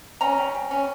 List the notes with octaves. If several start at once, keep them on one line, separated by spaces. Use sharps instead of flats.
C#4 A#5
G3
G3
C#4